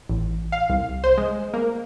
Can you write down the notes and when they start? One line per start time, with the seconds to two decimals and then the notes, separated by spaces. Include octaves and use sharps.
0.09 A1
0.52 F5
0.69 C2
1.04 C5
1.18 G#3
1.54 A#3